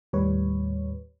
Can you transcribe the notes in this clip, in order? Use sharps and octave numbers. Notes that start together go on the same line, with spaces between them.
D#2 A2 G3 B4 C#5